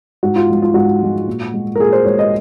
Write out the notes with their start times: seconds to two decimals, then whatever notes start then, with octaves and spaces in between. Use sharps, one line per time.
0.23 G#2 F#4
0.36 F4
0.48 F3 G#3
0.62 F4
0.74 G#2 F#4
1.02 F3 G#3
1.28 A#2
1.54 G#3
1.75 A#4
1.79 A#2 G#4
1.92 C5
2.05 G#3 C#5
2.19 D#5